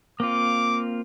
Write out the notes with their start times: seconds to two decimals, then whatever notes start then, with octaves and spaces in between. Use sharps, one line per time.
0.20 A#3 C4 F4 D6